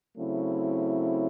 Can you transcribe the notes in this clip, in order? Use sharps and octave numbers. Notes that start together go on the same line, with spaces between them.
C#3 F#3 A3 C4 E4